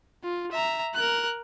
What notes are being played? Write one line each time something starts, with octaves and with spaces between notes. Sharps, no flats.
F4
E5 A#5
A#4 F#6